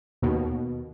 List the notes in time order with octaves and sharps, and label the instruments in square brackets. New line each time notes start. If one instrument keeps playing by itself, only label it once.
[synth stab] D#2 B2